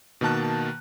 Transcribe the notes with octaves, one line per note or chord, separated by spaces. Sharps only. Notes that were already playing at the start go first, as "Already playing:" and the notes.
B2 D#3 A#3 A5 F#6